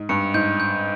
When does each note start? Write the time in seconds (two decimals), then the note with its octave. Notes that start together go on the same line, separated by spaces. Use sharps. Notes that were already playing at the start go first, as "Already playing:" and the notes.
Already playing: G#2
0.09 G2 C#7
0.34 G#2 G6
0.60 G6